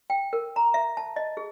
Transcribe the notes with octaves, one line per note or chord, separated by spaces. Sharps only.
G5
A#4
A#5
E5
A5
D#5
G#4